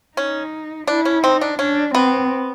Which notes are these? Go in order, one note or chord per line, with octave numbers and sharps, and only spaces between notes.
C#4 D#4
D4 E4
C#4
C4 D#4
D4
C#4 D4
B3 C4